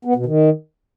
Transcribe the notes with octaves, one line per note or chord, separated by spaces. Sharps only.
B3
B2
D#3